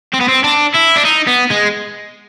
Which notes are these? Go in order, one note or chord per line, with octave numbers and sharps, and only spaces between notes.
C4
B3
C4
D4
E4
D4
D#4
B3
G#3